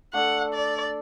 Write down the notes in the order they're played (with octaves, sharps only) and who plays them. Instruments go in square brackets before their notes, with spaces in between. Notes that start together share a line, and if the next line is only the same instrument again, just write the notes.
[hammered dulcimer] A3 D4 A4 [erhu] F#5
[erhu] D5